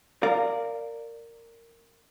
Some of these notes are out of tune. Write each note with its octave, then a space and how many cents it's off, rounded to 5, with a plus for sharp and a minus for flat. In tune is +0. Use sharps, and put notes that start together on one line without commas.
A#4 -15 D5 +0 F5 +0